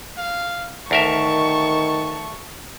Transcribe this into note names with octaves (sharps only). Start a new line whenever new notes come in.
F5
D2 D#3 A#4 E5 A5 C#6